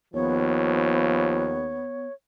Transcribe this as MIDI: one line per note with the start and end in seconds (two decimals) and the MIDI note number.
0.14 1.88 39
0.14 1.59 53
0.14 2.07 59
0.14 2.13 73